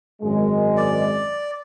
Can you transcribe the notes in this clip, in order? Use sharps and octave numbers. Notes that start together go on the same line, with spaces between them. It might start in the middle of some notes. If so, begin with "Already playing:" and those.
G#1 F#2 G#3
D5